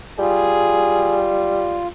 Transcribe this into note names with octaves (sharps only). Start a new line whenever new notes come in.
G3 F4 G#4